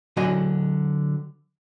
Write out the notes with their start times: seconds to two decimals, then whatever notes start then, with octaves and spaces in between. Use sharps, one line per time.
0.17 D3 F#3 F#4 D#5 G#5